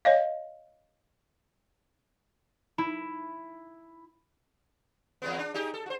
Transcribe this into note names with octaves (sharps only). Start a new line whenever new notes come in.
C#5 D#5 F5
E4
E2 G#3 B3
D4
D#4 G4 G#4
A4
F#4 C5